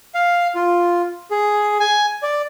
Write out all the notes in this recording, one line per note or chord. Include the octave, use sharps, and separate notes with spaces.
F5
F4
G#4
G#5
D5